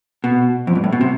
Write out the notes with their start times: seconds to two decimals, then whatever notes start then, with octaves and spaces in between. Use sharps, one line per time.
0.24 B2
0.67 F2
0.75 G2
0.84 A2
0.92 B2
1.01 C3